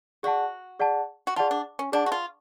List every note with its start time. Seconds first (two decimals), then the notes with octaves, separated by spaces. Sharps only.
0.23 F#4 G#4 D5 F#5 A5
0.79 G#4 D5 F#5 A5
1.27 F#4
1.36 F4 G#4 D5 F#5 A5
1.51 D4
1.79 C#4
1.92 D4 G#4 D5 F#5 A5
2.06 F#4
2.12 F4